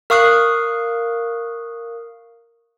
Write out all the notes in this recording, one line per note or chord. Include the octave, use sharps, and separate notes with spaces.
A#4 F5 C#6 D#6 F#6 C7